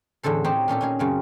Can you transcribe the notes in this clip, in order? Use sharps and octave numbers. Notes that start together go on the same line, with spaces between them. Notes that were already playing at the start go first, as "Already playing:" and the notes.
E2 A2 D3 A4 C5
C4 D#4 G4 C5 C#5
A#2 C#4 G4 A4
C#4 D#4 G#4
F#2 C#3 C4